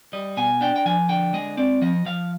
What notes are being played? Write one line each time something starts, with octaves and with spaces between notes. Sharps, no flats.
G3 D#5
B2 G#5
D4 G5
G5
F3 G#5
D3 G5
G#3 D#5
C4 D5
F3 D#5
F3 F5